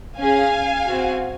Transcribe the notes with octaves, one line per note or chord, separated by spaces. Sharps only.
C#4 G#4 F5 G#5
C4 F#4